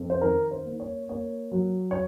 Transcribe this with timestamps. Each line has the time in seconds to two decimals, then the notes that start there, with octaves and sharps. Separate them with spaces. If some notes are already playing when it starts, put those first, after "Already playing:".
Already playing: F2
0.10 C5
0.21 D#3 A#4
0.51 C5
0.65 A#3
0.80 C#5
1.09 A#3 C#5
1.52 F#3
1.91 C#5